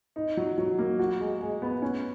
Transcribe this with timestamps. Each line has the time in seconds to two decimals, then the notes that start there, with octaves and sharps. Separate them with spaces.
0.16 D#4
0.37 F#3
0.58 F#3
0.78 A#3
0.99 F#4
1.20 G#3
1.41 G#3
1.62 B3
1.82 C#4